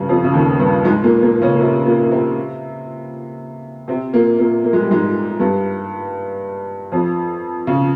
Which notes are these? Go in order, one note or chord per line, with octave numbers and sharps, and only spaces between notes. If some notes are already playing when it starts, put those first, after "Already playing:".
Already playing: G2 C#3 G3
F2 F3
C#3
D#2 D#3
G2 G3
G#2 G#3
A#2 A#3
A#2 A#3
C#3 C#4
A#3
C3 C4
A#2 A#3
A#3
C3 C4
C3 C4
A#2 A#3
A#2 A#3
A#3
G#3
G3
G#2 G#3
G2 G3
F2 F3
C#3